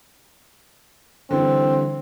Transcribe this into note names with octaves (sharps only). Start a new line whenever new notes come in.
D3 E3 G3 C4